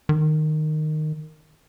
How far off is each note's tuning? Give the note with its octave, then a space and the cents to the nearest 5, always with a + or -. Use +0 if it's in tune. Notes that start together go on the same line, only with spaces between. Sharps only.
D#3 -15